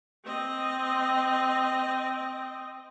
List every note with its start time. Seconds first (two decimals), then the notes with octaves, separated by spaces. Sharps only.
0.25 C4 D#5